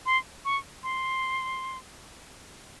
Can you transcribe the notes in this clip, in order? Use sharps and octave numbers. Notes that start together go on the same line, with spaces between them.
C6
C#6
C6